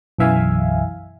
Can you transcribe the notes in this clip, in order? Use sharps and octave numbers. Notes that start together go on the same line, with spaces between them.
B1 F#2 E3 E5 F5 G#5